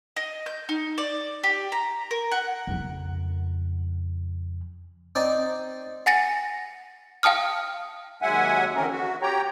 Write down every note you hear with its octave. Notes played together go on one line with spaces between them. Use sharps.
D#5
G6
D#4
D5
G4
A#5
A#4
F#5
F2 C#3
C4 D#4 D5 G5
F#5 G#5 A6 A#6 C#7
F5 G5 A5 D#6 F6
D#2 F#3 G#3 E5 F#5 G#5
D3 E3 F3 C4 C#4 A#4
F#4
G4 C#5 G5 A#5